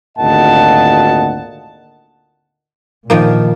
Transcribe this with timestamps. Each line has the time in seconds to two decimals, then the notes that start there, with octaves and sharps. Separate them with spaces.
0.18 G#1 D2 A#2 D#5 F#5 A5
3.10 A#2 D#3 F3 A#3